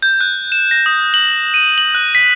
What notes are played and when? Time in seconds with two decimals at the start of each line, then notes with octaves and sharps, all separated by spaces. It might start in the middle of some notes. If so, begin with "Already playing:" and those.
0.02 G6
0.21 F#6
0.52 E7
0.71 A#6
0.86 D#6
1.14 F#7
1.54 D#7
1.78 F#7
1.95 F#6
2.15 B6